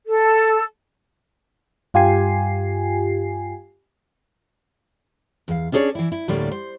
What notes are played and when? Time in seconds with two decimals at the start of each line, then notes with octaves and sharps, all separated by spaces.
0.08 A4
1.94 G2 F4 G4 G#5 C7
5.48 E2 F5
5.72 C#4 D4 G#4 A4 C#5 D5
5.95 E3 E4
6.12 E4
6.28 D2 A2 D3 G3 A#3 D5
6.51 C5